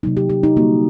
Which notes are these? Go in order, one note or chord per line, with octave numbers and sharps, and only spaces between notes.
C3 F#3 A#3 D#4
G4
G4
D#4
D3 G3 A#3 F#4